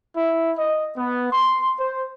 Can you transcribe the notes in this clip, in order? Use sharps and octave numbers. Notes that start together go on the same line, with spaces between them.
E4
D#5
B3
C6
C5